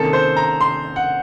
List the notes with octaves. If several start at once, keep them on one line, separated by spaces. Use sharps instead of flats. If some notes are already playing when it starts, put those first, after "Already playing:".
Already playing: C3 D#3 A#3 C#4 A4
C5
A#5
C6
F#5